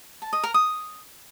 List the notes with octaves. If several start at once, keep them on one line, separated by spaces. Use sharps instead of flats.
A5
D#5
A#4
D#6